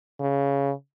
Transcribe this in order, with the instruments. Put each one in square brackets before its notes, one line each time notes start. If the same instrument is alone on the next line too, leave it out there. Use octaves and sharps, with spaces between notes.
[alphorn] C#3